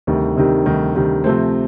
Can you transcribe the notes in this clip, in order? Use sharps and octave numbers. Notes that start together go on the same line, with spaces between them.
D2 C3 D#3 G3
D2 C3 D#3 G3
D2 C3 D#3 G3
D2 C3 D#3 G3
C3 F3 A3 C4